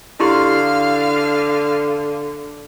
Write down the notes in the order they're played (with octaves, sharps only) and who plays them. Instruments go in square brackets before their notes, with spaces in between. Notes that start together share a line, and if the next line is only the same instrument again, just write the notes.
[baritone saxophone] D3 [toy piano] E4 G4 C6 [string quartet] F5 F6